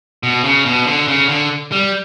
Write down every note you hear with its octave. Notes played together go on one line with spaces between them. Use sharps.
B2
C#3
B2
D3
C#3
D3
G3